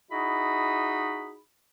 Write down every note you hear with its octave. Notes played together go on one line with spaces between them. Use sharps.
D#4 E4 F#4 G#4 D#5 B5